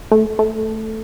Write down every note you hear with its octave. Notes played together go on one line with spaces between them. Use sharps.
A3
A3